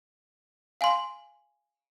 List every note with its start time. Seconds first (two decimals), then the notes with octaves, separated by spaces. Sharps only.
0.81 F5 G#5 C6